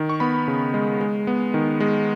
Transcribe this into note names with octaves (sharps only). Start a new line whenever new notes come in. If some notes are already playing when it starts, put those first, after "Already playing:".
Already playing: D#3
C#6
B3 B5
C#3
G#3
G#3
B3
D#3
G#3